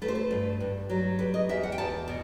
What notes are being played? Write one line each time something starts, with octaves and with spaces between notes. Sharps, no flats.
A3 B4
C5
B4
G2
G2
F#3
G3 B4
D#5
E2 E5
F#5
G5
E2 A5
B2